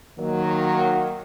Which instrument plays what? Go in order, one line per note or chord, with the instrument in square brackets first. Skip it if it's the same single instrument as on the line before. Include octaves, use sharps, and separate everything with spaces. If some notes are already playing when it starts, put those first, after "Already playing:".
[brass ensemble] D#3 F#3 A#3